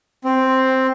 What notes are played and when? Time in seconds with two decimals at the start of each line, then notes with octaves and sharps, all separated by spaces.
0.24 C4